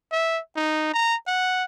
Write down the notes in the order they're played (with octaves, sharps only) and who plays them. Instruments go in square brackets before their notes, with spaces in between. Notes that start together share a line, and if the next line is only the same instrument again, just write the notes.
[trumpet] E5
D#4
A#5
F#5